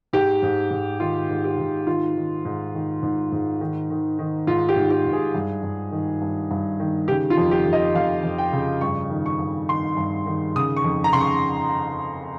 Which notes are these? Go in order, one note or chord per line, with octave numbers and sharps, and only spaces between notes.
G#2 G4
G#2
G#2
D#3 F4
G#2
G4
G#2
D#3 F4
D#3
G#2
D#3
G#2
G#2
D#3
D#3
D#3
G#2 F4
G4
G#2
G4
G#2
G#4
G2
G2
D#3
G2
G2
D#3
C#3 G4
F4
F2
G4
F2
D#5
F2 F5
F2
G5
C#3
G2 C#6
D#3
C#6
G2
D#3 C6
G2
D#3
C#3 D#6
C#6
F2
A#5
C#3 C6
C#6